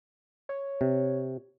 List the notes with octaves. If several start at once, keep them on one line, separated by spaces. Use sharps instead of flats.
C#5
C3